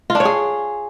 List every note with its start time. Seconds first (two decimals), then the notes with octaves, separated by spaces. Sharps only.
0.10 F4
0.15 D4
0.20 C#5
0.25 G#4